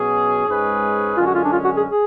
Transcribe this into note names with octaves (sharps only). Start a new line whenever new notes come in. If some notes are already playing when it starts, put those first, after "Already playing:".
Already playing: B2 F#3 C#4 G#4
G#2 G#3 C#4 G#4 B4
F#2 D3 G#3 C#4 F4
F#4
F4
D4
F4
F#4
G#4
G#4